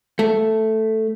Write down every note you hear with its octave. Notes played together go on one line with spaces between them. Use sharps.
A3